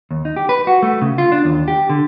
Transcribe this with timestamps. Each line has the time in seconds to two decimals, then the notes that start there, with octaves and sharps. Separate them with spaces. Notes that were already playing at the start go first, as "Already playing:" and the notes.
0.11 D#2
0.25 D#4
0.36 G4
0.49 B4
0.67 F#4
0.83 A3
1.02 C#3
1.18 F4
1.32 D4
1.45 D#2
1.68 G4
1.90 D3